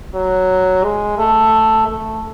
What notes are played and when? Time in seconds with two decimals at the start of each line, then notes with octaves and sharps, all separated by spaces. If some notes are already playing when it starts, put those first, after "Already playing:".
0.15 F#3
0.84 G#3
1.18 A3
1.87 A3